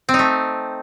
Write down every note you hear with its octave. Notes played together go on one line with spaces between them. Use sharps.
C4
D#4
A3